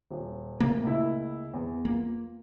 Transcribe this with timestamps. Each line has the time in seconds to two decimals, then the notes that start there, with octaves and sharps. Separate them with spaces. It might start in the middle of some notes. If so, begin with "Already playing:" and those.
0.11 D#1
0.60 C#3 A3 A#3
0.83 C#2 E4
1.54 E2
1.85 A#3 F4